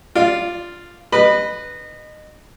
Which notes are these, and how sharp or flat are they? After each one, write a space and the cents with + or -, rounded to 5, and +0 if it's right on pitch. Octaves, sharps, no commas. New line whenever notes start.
F4 -5 D5 +0
B4 +0 D#5 -25 B5 +0